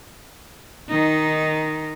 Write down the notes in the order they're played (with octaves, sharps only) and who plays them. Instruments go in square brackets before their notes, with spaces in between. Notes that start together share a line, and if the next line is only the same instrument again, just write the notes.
[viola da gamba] D#3 D#4